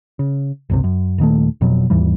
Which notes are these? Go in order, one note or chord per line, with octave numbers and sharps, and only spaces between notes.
C#3
G1 C#2 C3
F#2
D#1 A#2 D#3 A3
F1 F2 B2 F#3
D#2 G#2 E3 G3